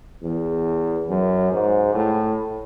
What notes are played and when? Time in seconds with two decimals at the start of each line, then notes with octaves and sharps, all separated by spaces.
0.22 E2
1.09 F#2
1.52 G#2
1.94 A2